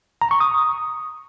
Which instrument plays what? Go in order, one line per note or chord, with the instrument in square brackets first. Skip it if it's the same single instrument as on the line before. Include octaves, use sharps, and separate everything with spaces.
[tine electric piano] A#5
C#6
D#6